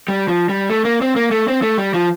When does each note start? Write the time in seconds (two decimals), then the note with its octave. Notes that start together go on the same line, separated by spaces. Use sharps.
0.08 G3
0.28 F3
0.49 G3
0.70 A3
0.85 A#3
1.01 C4
1.16 A#3
1.31 A3
1.48 C4
1.62 A3
1.78 G3
1.94 F3